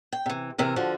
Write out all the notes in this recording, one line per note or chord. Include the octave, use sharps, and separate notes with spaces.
G5
C3 E3
C3 E3 A#4
D3 F3 F#4